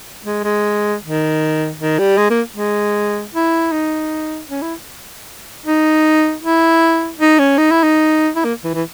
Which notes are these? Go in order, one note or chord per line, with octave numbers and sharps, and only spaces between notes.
G#3
G#3
D#3
D#3
G3
G#3
A#3
G#3
E4
D#4
C#4
E4
D#4
E4
D#4
C#4
D#4
E4
D#4
E4
A#3
E3
E3